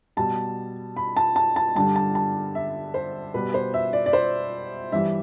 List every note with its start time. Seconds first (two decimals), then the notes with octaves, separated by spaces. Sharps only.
0.17 B2 G3 A5
0.97 B5
1.17 A5
1.36 A5
1.56 A5
1.75 G2 D3 G3 A5
1.96 A5
2.15 A5
2.55 E5
2.94 C5
3.34 B2 G3 B4
3.54 C5
3.74 E5
3.93 D5
4.06 D5
4.13 C5
4.92 G2 E3 G3 E5